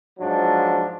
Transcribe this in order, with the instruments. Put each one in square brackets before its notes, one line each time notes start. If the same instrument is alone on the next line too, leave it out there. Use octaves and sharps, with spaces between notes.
[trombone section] G#2 F3 F#3 D4